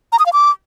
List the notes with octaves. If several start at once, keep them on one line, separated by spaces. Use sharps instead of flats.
A#5
D#6
F5
D6